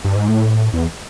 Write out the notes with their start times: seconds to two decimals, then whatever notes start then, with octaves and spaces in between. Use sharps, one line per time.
0.04 G2
0.16 G#2
0.28 A2
0.73 E2